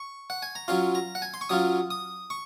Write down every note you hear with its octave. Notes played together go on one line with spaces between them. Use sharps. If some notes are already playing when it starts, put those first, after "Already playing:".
Already playing: C#6
F#5
G#5
A#5
F#3 C#4 F4 C6
A#5
F#5
G#5
C6
C#6
F#3 C#4 F4 D#6
D#6
C#6